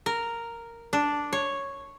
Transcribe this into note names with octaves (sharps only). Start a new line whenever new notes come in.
A#4
D4
C#5